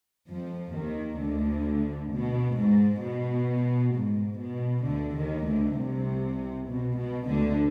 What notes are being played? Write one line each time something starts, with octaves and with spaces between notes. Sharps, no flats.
F2 F3
D#2 D#3
D2 D3
B2
G#2
B2
G#2
B2
D2 D3
D#2 D#3
D2 D3
C2 C3
B2
B2
D2 D3